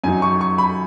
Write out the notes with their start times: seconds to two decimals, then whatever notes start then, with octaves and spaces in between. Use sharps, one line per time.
0.04 F#2 F#3 D#4 G#5
0.22 C#6
0.41 C#6
0.58 B5